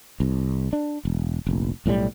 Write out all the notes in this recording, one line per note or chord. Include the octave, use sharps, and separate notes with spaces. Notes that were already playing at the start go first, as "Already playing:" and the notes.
C2
D4
E1
F1 A#1
B1 A2 E3 G3